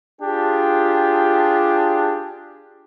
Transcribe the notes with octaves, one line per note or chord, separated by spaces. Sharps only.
D4 F4 G4 G#4